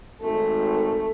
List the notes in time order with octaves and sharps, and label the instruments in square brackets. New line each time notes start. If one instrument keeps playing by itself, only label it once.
[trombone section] G#1 [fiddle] A3